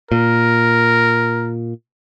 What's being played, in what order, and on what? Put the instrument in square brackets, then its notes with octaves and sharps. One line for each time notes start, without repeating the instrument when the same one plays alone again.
[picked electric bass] A#2 [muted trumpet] A#4